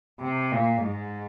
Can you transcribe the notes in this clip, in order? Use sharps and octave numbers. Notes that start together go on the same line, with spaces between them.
C3
A#2
G#2